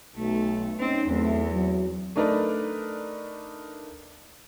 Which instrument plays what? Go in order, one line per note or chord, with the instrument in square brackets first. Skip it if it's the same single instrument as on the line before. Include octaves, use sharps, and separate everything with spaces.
[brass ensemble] B1 [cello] A3
[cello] C4 [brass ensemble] C#4 D#4
[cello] E2 [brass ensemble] F#3 A3 C4
[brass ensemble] F#3
[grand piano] A3 D4 D#4 A#4 B4 D5